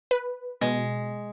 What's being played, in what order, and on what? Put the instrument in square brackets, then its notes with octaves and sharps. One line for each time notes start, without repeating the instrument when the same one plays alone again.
[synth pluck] B4
[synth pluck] B2 [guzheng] G#3